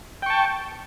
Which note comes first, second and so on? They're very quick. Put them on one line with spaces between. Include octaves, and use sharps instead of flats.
G5 C#6 A5